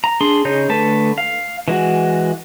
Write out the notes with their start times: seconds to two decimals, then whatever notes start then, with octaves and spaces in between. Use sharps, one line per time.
0.04 A#5
0.21 D4 G#4 C6
0.45 C#3 D#4 G#4 C#5 G6
0.69 D3 A3 B4 A5
1.18 F5
1.68 E3 G#3 F#4